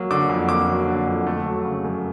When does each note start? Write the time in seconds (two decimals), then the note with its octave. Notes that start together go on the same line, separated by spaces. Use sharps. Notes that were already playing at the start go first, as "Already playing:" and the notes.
Already playing: F#3 A#3
0.11 D3 D6
0.29 F2
0.49 A#3 D6
0.69 F#3
0.88 D3
1.07 F2
1.27 A3
1.46 F#3
1.64 C#3
1.84 F#2